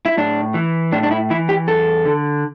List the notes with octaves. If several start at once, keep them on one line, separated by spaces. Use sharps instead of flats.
E4
A2 D4
E3
A2 D4
D4
E4
E3 E4
G4
E2 A4
D3